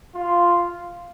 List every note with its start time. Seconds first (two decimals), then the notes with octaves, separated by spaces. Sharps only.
0.15 F4